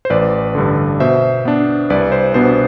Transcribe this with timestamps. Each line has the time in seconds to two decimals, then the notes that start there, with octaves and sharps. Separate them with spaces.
0.05 C5
0.10 A1 B4 D5
0.55 G2 D3
1.00 B2 C5 E5
1.45 B3 D4
1.90 C2 B4 D5
2.12 C5
2.34 B2 B3 D4 C5